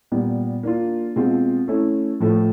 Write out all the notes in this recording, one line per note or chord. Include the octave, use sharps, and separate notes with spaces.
A#2 G3 B3
A#3 D4 F4
B2 G#3 C4 F4
A3 C#4 E4
A2 F3 A3